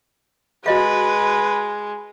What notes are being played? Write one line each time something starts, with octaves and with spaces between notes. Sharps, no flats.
G#3 F#4 B4 D#5 F5